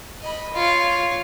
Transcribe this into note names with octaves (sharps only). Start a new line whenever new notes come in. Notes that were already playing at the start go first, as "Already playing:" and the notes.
D#5 B5
F4 C#5